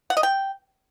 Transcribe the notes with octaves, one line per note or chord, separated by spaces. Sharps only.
F#5
D#5
G5